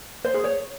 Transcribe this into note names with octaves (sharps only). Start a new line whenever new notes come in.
C5
G#4
C#5